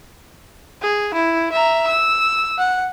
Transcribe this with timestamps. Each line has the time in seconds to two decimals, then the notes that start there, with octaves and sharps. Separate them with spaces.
0.82 G#4
1.14 E4
1.52 E5 A#5
1.87 E6
2.58 F#5